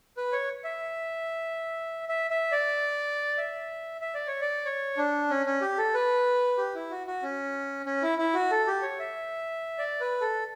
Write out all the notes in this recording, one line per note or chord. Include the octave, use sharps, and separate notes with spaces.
B4
C#5
E5
E5
E5
D5
E5
E5
D5
C#5
D5
C#5
D4
C#4
C#4
G4
A4
B4
G4
E4
F#4
F#4
C#4
C#4
E4
E4
F#4
A4
G4
C#5
E5
D5
B4
A4